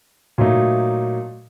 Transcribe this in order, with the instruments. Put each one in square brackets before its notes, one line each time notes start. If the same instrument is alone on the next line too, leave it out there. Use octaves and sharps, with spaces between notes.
[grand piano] A#2 F#3 A3 D#4